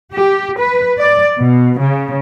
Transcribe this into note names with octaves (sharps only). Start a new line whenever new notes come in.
G4
B4
D5
B2
C#3